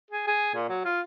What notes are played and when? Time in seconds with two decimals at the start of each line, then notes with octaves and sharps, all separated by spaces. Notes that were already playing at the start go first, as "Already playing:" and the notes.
0.11 G#4
0.27 G#4
0.55 A#2
0.69 F#3
0.85 F4